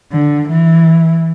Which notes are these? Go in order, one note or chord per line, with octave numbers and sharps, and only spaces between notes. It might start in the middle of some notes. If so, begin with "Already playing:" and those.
D3
E3